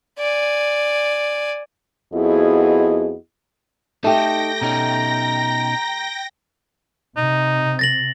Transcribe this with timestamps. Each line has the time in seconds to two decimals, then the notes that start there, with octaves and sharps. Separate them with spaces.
0.18 D5 G#5
2.13 F2 B3 E4 F#4 G#4 D#5
4.04 A3 D#4 G4 G5 A5 A#6
4.61 B2 C#4 D#4 A#5
7.17 C3 D#4
7.79 A6 A#6 F#7